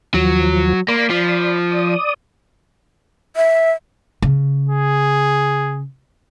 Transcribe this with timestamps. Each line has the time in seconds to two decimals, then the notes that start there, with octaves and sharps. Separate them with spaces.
0.14 D#2 F3 F#3
0.88 A#3 D5 B5 C6
1.10 F3
1.71 D5 D#6
3.36 E5
4.22 C#3
4.69 G#4